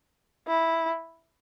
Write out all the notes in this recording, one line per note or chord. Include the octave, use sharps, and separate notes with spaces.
E4